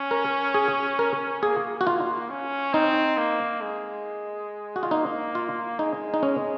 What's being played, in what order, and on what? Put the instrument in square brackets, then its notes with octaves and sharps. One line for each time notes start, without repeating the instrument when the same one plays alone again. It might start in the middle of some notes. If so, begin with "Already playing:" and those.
Already playing: [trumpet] C#4
[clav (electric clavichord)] A#4
G#4
A#4
[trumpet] A#3 [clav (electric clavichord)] G#4
[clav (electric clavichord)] F#4
F4
[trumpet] C#4
[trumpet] C4 [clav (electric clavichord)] D#4
[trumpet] A#3
G#3
[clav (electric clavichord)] F#4
F4
[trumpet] A#3 [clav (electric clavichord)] D#4
[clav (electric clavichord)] F4
[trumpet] G#3 [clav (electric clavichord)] D#4
[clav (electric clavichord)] D#4
C#4